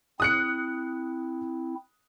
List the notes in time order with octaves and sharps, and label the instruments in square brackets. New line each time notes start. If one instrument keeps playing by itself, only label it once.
[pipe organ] C4 E4 [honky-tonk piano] D#6 F#6 C#7